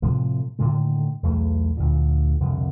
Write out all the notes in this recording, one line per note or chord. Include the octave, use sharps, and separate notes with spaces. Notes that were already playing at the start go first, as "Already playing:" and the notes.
A2 C3 F3 G#3
A2 D3 D#3 G#3
B1 E2 A3
D2 A#2
C2 F2 B2 D3